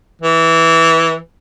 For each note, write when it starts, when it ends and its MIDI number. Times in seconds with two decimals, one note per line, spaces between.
0.22 1.18 52